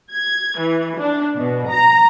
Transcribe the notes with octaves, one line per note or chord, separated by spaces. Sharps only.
G#6
E3
D4
B2
A#5